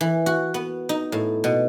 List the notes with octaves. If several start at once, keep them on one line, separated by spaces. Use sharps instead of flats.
E3
F#4
B3
D#4
A2
B2